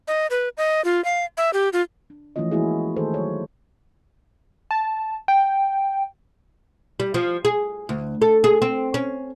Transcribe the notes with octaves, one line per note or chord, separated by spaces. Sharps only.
D#5
B4
D#5
F4
F5
E5
G4
F4
D4
E3 F3 A3 C#4 F4 D#5
E3 G#3 A#3 E4 F#4 G#4
D#3 A3 G#4 A4 C5
F#3 C#5
A5
G5
G3
F3
G#4
D2
A4
G#4
C4
C#4